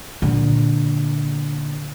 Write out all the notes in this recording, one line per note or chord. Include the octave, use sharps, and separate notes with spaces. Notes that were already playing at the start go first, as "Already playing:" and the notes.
A#2 D3